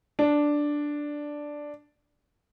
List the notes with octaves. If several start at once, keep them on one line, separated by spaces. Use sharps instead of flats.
D4